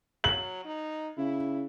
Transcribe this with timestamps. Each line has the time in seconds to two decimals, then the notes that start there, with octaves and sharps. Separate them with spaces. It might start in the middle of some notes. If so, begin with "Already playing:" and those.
0.24 F#3 F#7
0.65 D#4
1.18 C#3 E4